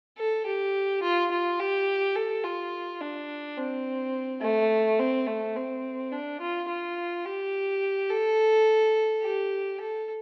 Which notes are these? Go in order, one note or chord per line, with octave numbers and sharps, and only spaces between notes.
A4
G4
F4
F4
G4
A4
F4
D4
C4
A3
C4
A3
C4
D4
F4
F4
G4
A4
G4
A4